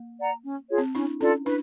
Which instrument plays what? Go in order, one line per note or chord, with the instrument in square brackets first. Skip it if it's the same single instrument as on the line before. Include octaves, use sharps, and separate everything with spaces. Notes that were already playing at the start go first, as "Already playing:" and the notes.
Already playing: [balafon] A#3
[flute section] D5 F#5 A#5
C#4
F4 G#4 C#5
[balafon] C4
[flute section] C#4 [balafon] D4 E4
[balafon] C#4 D#4 [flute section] F4 A4 D5
[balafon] D4 E4 [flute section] B4